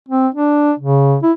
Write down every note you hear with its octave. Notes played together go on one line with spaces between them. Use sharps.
C4
D4
C#3
E4